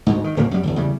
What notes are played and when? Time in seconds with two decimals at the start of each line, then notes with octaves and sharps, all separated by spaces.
0.06 D2 G#2
0.24 D#3
0.37 D1 G#1 C#3 A#3
0.51 F#2 G3
0.63 G1 E2
0.76 E2 C#3 G3